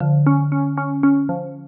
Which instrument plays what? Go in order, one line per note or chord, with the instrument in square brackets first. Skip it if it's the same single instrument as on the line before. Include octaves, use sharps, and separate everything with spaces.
[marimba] D3 [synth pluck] F3
[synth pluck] C#4
C#4
C#4
C#4
F3